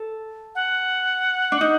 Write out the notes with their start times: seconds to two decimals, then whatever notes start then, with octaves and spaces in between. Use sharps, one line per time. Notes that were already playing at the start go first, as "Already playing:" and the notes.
Already playing: A4
0.55 F#5
1.52 D4
1.61 D#4